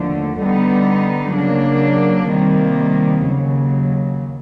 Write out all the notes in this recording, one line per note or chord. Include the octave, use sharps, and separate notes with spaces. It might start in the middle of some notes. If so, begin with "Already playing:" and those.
Already playing: D#2 D3 F3 A3
D3 G3 B3 D#4
C#3 F#3 A#3 D4
C3 D#3 G3 A#3
D#2 C#3 F#3